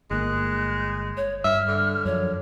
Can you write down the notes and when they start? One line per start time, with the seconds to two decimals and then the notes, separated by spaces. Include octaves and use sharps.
0.11 G1 G#3 A#3 F#6
1.17 C#5
1.44 G2 E5 F6
1.67 D3
2.05 F#2 F3 C#5